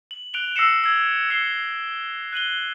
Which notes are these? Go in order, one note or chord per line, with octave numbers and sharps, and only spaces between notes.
F#7
F#6 D7 F7 G7
E6 A#6 C7 C#7 E7
E6 G#6
E6 C7 C#7 F7 G7
F#6 D#7 F#7 G7